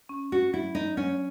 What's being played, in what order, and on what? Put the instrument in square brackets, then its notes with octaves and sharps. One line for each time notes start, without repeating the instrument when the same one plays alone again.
[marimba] C#4
[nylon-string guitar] F#4
[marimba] F#3 [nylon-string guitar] E4
[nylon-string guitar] D#4
[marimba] F#3 [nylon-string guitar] C#4